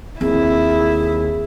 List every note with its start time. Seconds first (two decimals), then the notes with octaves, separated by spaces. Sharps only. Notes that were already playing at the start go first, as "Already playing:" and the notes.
0.21 D#2 C4 E4 G#4